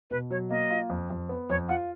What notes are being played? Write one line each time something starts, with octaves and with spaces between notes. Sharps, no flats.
B2 B4
F#3 C#5
A#3 D#5
F4
F2
F2
B3
F2 C#5
F4 F#5